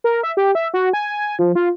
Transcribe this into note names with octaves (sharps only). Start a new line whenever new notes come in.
A#4
E5
G4
E5
F#4
G#5
F3
F4